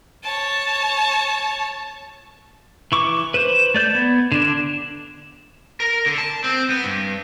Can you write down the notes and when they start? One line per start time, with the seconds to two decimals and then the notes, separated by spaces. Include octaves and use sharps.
0.23 C#5 A5
2.92 E3 C#6 D6
3.34 B4 C5 E7
3.74 A3 D5 G6 A6
3.95 B3 G#6
4.32 D3 D4 E7
5.80 A#4
6.06 D3
6.18 A5
6.44 C4
6.70 B3
6.84 G2